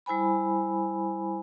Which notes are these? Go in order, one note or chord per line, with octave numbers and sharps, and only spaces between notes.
G3 E4 C5 G#5 B5